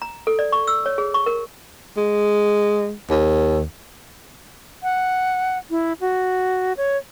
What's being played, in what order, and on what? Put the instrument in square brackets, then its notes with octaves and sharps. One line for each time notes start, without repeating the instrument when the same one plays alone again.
[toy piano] A#5
A4
D5
C#6
E6
C#5
G#4
C#6
A#4
[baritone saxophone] G#3
D#2
[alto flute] F#5
E4
F#4
C#5